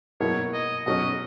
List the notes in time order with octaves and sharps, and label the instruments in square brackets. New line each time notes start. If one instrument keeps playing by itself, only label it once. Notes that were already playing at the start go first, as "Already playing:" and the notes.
[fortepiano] B2 F#3 A#3 E4 [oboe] C#5
[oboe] D#5
[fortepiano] B2 F#3 C#4 [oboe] D#5